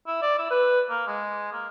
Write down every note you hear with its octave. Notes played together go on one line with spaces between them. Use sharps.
E4
D5
E4
B4
A#3
G#3
A#3